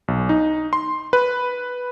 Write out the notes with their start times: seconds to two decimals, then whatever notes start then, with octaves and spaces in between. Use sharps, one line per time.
0.08 B1
0.29 D#4
0.73 C6
1.13 B4